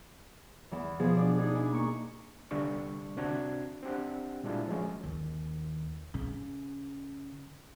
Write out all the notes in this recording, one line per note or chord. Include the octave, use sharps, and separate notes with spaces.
E2 E3
B2 F3 G#4
D4 F#4 D5
D4 D#4 G#4
D4 E4 G#5
A#3 D#4 C#6
C2 D3 G3 D4 C#6
C3 C4 D4 F#4 G#6
C4 D4 G4 F#5
A#2 G3 G#3 D4 E4 F4
F3 F#3 G#3 C#4
D#2
C#3